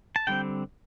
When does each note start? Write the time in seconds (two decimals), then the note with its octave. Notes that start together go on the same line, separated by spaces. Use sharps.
0.16 A5
0.27 D3 G3 C4 G5